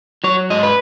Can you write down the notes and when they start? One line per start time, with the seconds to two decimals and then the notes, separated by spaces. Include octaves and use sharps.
0.24 F#3 C#5
0.50 G#2 D#5
0.63 B4